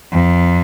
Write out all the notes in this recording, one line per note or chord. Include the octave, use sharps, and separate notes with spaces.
F2